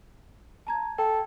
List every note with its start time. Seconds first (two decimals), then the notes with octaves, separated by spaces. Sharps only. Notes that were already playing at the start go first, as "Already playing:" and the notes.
0.67 A5 A#5 G#6
0.98 A4 G5